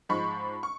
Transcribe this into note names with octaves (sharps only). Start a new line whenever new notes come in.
G#2 F3 G#3 B5 C#6
C#6